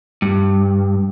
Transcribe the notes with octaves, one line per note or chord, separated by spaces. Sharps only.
G2